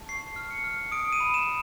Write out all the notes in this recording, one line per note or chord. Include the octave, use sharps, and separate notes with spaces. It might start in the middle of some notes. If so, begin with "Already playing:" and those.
Already playing: A5
C#6 C7
F6
C#7
F6
D#6 D7
D#7
B5
E7